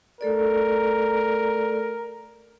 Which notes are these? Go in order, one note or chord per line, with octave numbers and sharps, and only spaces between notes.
A3 A4 A#4 D5